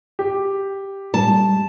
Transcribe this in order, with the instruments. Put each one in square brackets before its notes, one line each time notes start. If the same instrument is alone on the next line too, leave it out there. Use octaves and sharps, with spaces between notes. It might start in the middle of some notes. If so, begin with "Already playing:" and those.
[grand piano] G4
[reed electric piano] G3 G#3 [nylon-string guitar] A5